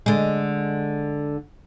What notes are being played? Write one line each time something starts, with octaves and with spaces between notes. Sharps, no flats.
D3 G#3